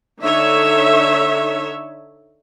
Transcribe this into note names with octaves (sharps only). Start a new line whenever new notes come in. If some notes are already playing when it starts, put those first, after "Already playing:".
D3 D#4 C#5 E5